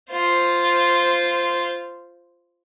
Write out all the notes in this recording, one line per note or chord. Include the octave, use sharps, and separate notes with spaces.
F4 C5